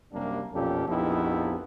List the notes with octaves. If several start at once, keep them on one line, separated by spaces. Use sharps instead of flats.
C2 F#2 C3 G3 A#3 D4
B1 F2 A#2 C#4 G4 A4
A#1 F2 B3 D#4 E4 G4